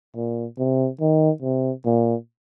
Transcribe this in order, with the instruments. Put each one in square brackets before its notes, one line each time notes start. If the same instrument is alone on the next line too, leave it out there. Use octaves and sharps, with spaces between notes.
[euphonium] A#2
C3
D#3
C3
A#2